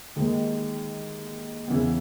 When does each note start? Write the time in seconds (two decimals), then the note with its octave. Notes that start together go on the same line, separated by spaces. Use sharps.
0.16 D#2 D#3 G#3 D#4
1.67 E2 C#3 E3